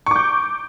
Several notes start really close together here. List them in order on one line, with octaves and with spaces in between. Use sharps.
C#6 D6 G6